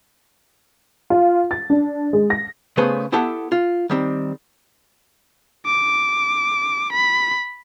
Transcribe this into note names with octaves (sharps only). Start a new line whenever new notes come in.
F4
A6
D4
G#3
A#6
C#3 A3 B3 G#4 B4 C5
B3 E4 G4 A4 F#5 A5
F4
D#3 G3 C4
D6
B5